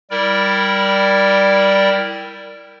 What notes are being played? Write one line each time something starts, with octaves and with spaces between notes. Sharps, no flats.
G3 E4 A#4 D5 G5